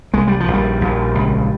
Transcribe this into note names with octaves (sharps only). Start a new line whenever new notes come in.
C2 G#3
G3
F3
A#1
G3
A#1
C#2